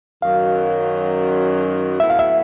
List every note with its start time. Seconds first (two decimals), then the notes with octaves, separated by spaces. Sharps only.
0.22 F#2 D#3 F#3 F5
2.00 A2 F#3 B3 E4 E5
2.10 F5
2.19 E5